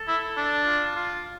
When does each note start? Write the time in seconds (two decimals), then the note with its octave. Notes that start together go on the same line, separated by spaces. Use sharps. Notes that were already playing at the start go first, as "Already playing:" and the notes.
Already playing: A4
0.08 E4
0.37 D4
0.66 F4
0.96 F4